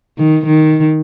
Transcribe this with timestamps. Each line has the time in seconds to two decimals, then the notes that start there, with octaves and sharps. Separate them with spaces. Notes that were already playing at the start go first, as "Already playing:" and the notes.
0.18 D#3
0.46 D#3